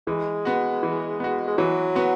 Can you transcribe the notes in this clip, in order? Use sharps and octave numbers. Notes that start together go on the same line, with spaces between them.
E3 G#3
B3 F#4
E3
B3 F#4
G#3
E3 F#3
B3 F#4